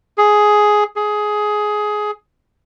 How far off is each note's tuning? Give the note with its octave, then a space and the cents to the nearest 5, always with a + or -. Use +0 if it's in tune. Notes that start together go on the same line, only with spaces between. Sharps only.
G#4 +10
G#4 +15